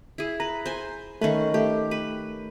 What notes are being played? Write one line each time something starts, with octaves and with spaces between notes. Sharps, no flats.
E4 G#4
B4 A#5
C5 G#5
D#3 A3 C#4 B4
A3 G4
B4